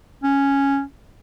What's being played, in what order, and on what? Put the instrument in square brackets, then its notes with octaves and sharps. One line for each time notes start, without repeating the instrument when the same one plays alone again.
[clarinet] C#4